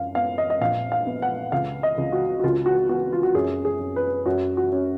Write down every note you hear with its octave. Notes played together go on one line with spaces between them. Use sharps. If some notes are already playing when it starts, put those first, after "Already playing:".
Already playing: F#2 F5
B3 F5
D#5
D#5
A#1 F5
F5
B3
F#5
C#2 F5
D#5
C#2
F#4
F#4
C#2 F4
F#4
B3 F#4
F4
F#4
F#2 G#4
G#4
F#2
B4
F#2 F#4
F#4
C#4